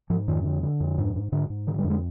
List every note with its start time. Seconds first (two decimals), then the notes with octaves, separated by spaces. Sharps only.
0.10 G#2 F3
0.28 F2 D#3
0.45 D3
0.63 D3
0.80 F2
0.98 G#2
1.15 G#2
1.32 G#2 D3
1.50 G#2
1.67 D3 D#3
1.79 G3
1.84 F2
1.90 G#3